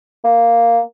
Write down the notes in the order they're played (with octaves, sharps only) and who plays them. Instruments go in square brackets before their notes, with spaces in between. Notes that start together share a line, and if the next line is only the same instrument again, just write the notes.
[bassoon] A#3